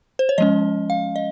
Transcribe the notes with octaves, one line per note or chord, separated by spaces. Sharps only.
C5
C#5
F3 G#3 C#4 D#5
F5
D#5